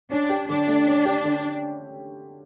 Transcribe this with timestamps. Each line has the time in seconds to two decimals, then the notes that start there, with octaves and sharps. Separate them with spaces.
0.11 C#4 D4
0.29 G4
0.48 D3 D4
0.67 A3
0.87 C#4
1.05 G4
1.24 D3